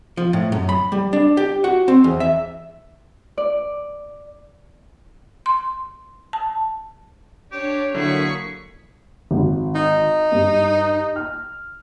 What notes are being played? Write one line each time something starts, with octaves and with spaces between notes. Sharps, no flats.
F3
A2
F#2
B5
G3
D4
G4
F#4
C4
E2
E5
D5
C6
A5
D4 G4 C#5
D3 F#3 A#3 E4 G#4 C#6 B6
G#1
D#4
G2
F6